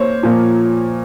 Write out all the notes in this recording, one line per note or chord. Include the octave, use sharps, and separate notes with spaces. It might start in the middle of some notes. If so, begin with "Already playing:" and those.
Already playing: A#3 C5 C#5
A#2 F3 A#3